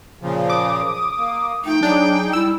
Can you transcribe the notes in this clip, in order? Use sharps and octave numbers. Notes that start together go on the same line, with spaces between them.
A#2 C#3 F3
D6 D#6
A#3
F3 A3 D#4 G5
F#3 D4 D#4 G#4
G3 E4 E6